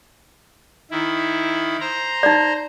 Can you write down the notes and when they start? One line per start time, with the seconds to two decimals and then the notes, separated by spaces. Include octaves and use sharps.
0.91 D#3 E4
1.81 C5 A#5
2.23 D#4 D5